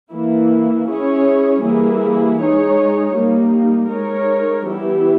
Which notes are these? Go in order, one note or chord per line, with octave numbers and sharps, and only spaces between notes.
E3 A#3 E4
C#4 E4 G#4 C#5
E3 G3 A#3 E4 G#4
G#3 D#4 G#4 C#5
G3 A#3 D#4
G#3 D#4 A#4 C#5
E3 G3 B3 E4 G4